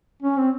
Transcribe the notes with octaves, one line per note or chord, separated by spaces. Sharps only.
C#4
C4